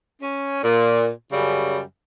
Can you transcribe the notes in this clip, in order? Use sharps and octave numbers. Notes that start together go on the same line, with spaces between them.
C#4
A#2
F#2 C#3 G3